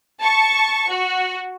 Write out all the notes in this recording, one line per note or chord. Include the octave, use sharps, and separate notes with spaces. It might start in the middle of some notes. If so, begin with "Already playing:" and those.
A5 C#6
F#4